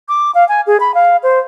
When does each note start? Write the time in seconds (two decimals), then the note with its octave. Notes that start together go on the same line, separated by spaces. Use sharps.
0.08 D6
0.35 F5
0.49 G#5
0.67 G#4
0.80 B5
0.94 F5
1.23 C5